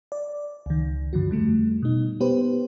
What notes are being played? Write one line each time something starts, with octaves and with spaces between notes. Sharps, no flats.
D5
C#2 D#3
G2 D3 F3 F#4
F2 D3 G3 A3
B2 D#4
B3 G4 B4 C5